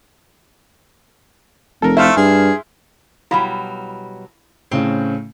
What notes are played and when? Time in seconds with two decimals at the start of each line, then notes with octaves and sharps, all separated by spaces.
1.82 F1 A4 A#4
1.97 A3 E4 C5 F5
2.17 G2 G#4
3.31 B2 F#3 G3 E4 F5 B5
4.71 A2 C#3 C4 C#4